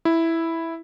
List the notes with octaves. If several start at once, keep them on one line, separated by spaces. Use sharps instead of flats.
E4